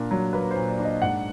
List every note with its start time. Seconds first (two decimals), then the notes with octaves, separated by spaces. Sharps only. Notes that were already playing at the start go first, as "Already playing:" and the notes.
Already playing: A#2 D4 A#4
0.11 F#3
0.33 A#3 B4
0.51 C5
0.56 A#2
0.68 D5
0.79 D4
0.85 D#5
1.02 G#2 F#5